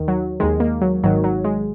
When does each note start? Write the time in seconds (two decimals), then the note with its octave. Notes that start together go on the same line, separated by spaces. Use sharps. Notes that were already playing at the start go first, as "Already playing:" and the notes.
Already playing: D#2 D#3
0.08 F#3
0.40 D#2 D#3 G#3
0.60 A#3
0.82 F#3
1.04 G#1 G#2 D#3 F#3
1.24 F#3
1.45 G#3